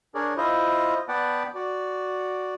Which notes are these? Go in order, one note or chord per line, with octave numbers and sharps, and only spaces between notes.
D4 G#4 A#4 C#5 D5
E4 F4 C5 D#5
B3 B4 D5 F#5 G5 A5
F#4 D5